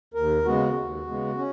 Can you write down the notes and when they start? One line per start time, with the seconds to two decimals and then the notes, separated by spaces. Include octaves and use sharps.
0.14 D#2 A#4
0.45 C#3 G#3 B3 F#4
0.76 D#2
1.07 C#3 G#3 B3
1.38 C#4